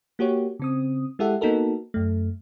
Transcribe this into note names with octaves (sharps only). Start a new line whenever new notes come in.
A#3 F#4 G4 C#5
C#3 C4 D#6
G#3 E4 G4 A4 E5 F#5
A#3 B3 D#4 F#4 A4 A#4
F#2 A3